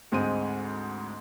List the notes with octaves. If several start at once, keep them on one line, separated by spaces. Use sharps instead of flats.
D2 G#2 G#3 C4 D#7